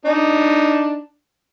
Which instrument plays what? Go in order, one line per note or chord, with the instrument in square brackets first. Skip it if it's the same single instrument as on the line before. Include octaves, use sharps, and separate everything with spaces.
[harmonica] D4 D#4